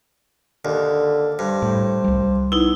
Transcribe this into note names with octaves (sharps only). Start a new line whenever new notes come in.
D#2 D3
G2 C5
A2
C2 G3
B3 D#4 E4